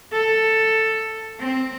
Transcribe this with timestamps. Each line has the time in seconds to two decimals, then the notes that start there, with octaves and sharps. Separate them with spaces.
0.13 A4
1.40 C4